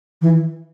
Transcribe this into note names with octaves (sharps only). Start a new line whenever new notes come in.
E3